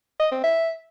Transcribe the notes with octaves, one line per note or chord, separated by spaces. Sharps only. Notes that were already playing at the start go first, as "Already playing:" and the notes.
D#5
C4
E5